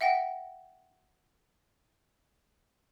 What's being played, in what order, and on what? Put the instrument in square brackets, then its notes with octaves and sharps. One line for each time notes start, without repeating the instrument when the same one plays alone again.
[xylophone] E5 F#5 G5 A#6